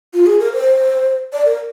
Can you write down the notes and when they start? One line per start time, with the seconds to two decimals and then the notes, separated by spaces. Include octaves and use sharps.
0.14 F4
0.26 G#4
0.40 A#4
0.53 C5
1.33 D5
1.46 A#4